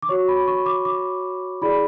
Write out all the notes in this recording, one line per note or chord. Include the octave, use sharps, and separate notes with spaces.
D6
F#4 C#5 C#6
B5
C#6
D6
D6
E4 G#4 D5 B5